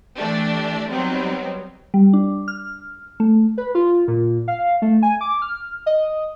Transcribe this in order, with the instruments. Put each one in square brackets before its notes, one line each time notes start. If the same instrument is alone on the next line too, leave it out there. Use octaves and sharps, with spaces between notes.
[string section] E3 A3 D4 G4
F#3 G3 B3 C4 D#4
[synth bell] G3
D4
F6
A3
[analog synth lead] B4
F4
A#2
F5
A3
G#5
D6
F6
D#5